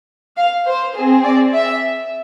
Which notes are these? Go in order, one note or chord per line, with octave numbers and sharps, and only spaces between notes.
F5
C5
C4 G#4
D5
E5